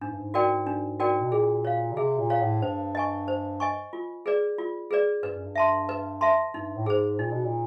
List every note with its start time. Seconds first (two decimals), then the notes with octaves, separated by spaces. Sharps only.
0.01 G#2 D4
0.10 G2
0.19 G#2
0.34 F#4 A#4 D5 G5
0.67 D4
1.00 F#4 A#4 D5 G5
1.21 B2
1.32 A#2 G#4
1.65 C#5 F5
1.92 C#3
1.97 C3 G#4
2.19 A#2
2.30 C#5 F5
2.41 A2
2.62 G2 C5
2.95 D#5 G#5 C#6
3.28 C5
3.60 D#5 G#5 C#6
3.93 F4
4.26 G#4 B4 D5
4.58 F4
4.91 G#4 B4 D5
5.23 G2 B4
5.34 F#2
5.45 G2
5.55 E5 A5 C6
5.89 B4
6.21 E5 A5 C6
6.53 G2 D#4
6.76 A2
6.86 G#2 G#4 C5
7.19 A#2 D#4
7.32 B2
7.45 A#2